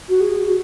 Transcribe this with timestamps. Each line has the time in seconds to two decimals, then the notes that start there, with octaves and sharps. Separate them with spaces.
0.09 F#4
0.20 G#4
0.47 F#4